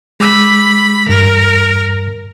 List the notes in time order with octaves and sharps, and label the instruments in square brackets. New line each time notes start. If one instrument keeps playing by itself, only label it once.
[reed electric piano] G#3 D6 E6 [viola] B5
[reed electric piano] E2 G2 [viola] A#4